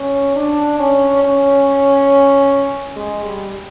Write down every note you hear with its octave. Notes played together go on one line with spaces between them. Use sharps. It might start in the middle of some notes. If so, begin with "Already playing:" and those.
Already playing: C#4
D4
C#4
C#4
G#3
G3